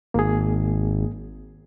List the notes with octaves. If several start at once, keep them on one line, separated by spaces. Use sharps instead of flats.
G#1 A#3 G#4